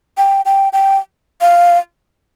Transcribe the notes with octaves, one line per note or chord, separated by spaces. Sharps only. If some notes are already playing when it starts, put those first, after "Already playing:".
G5
G5
G5
F5